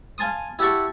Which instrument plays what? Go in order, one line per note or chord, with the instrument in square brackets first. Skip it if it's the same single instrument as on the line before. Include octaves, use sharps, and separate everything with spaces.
[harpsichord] F5 G#5 A5 C6 D#6
E4 G4 E5 F#5 A5 C#6